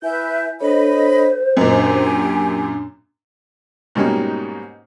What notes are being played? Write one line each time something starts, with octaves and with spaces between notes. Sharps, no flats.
E4 B4 E5 G#5 G6
D4 A4 C5 C#5 D#5 B5
F#2 A#2 D#5
D4 G4 G#5
G#2 B2 G3 A#3 C#4 D#4